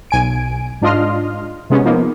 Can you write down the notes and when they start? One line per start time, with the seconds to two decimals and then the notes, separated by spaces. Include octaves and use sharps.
0.11 B1 G#5 D7
0.82 G#2 D4 F4 D#5 C6 F6
1.70 C3 G#3 B3 C#4
1.85 F3 A#3 B3 D#4